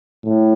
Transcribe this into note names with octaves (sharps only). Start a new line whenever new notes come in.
A2